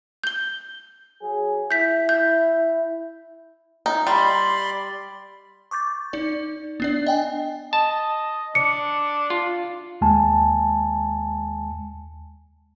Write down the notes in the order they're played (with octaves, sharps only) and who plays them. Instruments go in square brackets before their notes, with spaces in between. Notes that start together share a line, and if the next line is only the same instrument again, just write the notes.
[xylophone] G6 G7
[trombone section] F#3 G#4
[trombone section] E4 [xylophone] G6 B6
[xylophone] G6
[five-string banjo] D#4
[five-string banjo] G3 [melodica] D5 B5 C6
[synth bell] C#6 D6 G6 A6
D#4 D5
B3 D4 D5
D#5 G5 G#5
[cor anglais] D#5 [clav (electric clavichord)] A5
[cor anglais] D4 [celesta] C#7
[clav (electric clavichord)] F4
[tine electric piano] D#2 G#3 G#5 A5